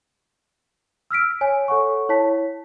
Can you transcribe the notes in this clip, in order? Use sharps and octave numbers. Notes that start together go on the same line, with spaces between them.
E6 F6 B6 D7
C#5 G#5
A4 C#5 F#5 C#6
E4 C#5 A5 B6